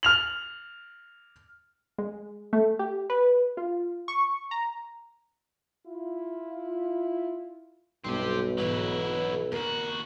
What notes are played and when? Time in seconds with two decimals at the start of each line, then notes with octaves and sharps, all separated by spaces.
0.03 F6 F7 F#7
1.98 G#3
2.53 A3
2.79 G4
3.10 B4
3.57 F4
4.08 C#6
4.51 A#5
5.87 E4 F4
8.04 B1 G2 C4 G4
8.58 G#2 E3 F#3 D#4 E4
9.52 D#2 F#4 A#4